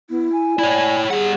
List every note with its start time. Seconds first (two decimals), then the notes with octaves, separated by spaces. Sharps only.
0.10 B3 E4
0.32 G#5
0.59 E4 C#5 D5
1.11 G3 G#4 F#5